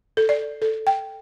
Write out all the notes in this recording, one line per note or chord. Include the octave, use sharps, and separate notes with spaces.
A4
D5
A4
G5